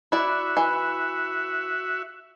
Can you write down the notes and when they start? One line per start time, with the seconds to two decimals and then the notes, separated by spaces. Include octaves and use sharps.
0.12 E4 F#4 D5 E5
0.57 E3